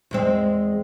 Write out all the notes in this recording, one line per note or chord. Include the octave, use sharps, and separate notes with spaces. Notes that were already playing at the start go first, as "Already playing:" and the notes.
E2 G#3 C4